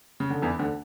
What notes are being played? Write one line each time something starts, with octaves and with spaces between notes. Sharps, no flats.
C#3
D3
E2 E3
D2 D3